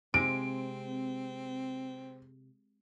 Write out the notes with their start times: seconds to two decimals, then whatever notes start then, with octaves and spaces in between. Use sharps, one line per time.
0.14 C3 G#3 C4 D7